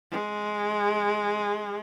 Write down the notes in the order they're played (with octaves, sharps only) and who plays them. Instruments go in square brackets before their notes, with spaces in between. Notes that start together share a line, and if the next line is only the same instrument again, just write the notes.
[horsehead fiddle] G#3